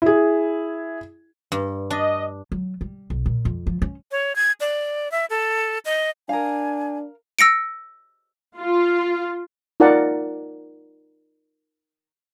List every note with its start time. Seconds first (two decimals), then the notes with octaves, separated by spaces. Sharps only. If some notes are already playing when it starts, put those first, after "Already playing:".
0.02 E4 G#4
1.52 G2
1.90 D4 D#5
2.52 F#3
2.81 G3
3.10 B1
3.26 A#2
3.45 F2
3.67 F3
3.82 C#4
4.11 C#5
4.36 G#6
4.60 D5
5.12 E5
5.30 A4
5.85 D#5
6.29 D4 A#4 F5 G#5
7.39 E6 A#6 C#7 D7
8.59 F4
9.80 D#4 F4 A#4 D5 F#5 A5